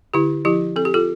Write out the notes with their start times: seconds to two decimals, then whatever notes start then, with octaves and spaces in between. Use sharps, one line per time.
0.14 D3 E4 G4
0.45 F3 E4 G4
0.76 C4 A4
0.85 G4
0.94 F4 A4